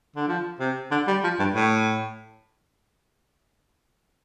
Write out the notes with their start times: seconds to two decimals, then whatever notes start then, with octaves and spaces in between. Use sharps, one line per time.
0.16 D3
0.28 F3
0.60 C3
0.91 D3
1.07 G3
1.24 F3
1.39 G2
1.55 A2